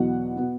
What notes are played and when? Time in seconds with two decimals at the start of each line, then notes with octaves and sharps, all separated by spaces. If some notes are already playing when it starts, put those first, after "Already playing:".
Already playing: E2 B2 F#3 B3 F#5
0.36 B2 B3